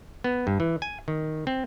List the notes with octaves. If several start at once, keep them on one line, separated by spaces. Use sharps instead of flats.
B3
G2
E3
G#5
D#3
C4